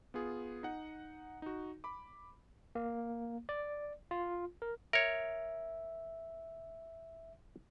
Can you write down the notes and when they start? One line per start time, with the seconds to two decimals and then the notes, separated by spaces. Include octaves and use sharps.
0.14 B3 F4 G#4
0.63 D#4 F#5
1.42 D#4 F#4
1.84 B5 D6
2.75 A#3
3.49 D5
4.11 F4
4.62 A#4
4.93 A#4 C#5 E5